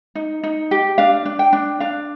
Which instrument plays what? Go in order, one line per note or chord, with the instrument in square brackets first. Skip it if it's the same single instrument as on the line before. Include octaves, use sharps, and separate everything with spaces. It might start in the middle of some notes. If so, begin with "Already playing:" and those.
[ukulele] D#4
D#4
G4
D4 F5
D4
G5
D4
D4 F5